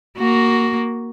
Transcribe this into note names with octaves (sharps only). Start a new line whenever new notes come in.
A#3 F#4